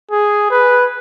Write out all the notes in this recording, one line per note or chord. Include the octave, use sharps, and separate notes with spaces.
G#4
B4